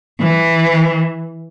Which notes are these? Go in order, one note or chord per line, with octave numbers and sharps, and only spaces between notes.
E3